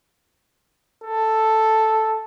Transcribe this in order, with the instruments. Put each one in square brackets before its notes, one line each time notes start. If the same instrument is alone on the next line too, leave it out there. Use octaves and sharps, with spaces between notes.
[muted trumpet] A4